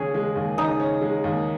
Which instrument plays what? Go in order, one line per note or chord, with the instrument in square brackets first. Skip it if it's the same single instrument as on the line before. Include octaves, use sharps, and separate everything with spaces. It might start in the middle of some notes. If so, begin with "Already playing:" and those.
Already playing: [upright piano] D#2 C#3 C#4 [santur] G#4
[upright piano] G#3
D#2
[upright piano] C#3 [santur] D#4
[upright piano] C#4
G#3
D#2